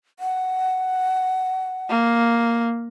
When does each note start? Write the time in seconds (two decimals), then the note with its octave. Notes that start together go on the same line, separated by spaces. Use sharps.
0.20 F#5
1.89 A#3